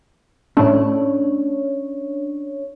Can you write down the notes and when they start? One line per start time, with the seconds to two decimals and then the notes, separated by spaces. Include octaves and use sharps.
0.57 A2 A3 C#4 D4 C#5